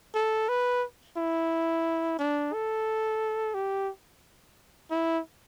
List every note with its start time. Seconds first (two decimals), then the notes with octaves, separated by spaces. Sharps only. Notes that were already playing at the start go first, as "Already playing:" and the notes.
0.15 A4
0.49 B4
1.17 E4
2.19 D4
2.53 A4
3.54 G4
4.90 E4